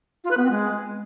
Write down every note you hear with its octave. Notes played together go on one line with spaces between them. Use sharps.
F4
B4
B3
C4
G#3